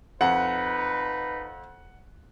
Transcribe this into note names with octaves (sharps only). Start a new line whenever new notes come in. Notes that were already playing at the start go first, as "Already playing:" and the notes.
F2 D#4 B4 F#5